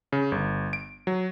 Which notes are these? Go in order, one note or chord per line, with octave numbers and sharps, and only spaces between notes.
C#3
G1
D7
F#3